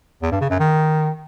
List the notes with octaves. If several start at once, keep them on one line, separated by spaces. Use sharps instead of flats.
E2
G2
C#3
F#2
D#3